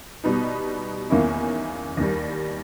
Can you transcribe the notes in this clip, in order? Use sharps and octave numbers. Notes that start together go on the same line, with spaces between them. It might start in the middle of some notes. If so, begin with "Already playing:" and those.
B2 G3 B3 D#4
E2 D#3 A#3 C#4 E4
D#2 D#3 G3